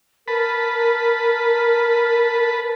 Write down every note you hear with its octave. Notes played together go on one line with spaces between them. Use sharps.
A#4 B4 A5 B5